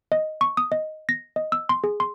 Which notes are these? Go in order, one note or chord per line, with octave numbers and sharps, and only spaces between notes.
D#5
C#6
D#6
D#5
A#6
D#5
E6
C6
G#4
C6